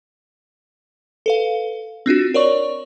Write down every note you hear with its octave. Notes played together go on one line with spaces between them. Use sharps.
A4 B4 F5
C4 D4 F4 F#4
A#4 C#5 D5 C#6